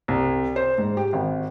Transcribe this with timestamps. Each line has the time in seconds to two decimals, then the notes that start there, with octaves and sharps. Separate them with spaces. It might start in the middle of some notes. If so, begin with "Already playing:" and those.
0.08 C2
0.56 C5
0.78 G#2
0.97 G4
1.13 G#1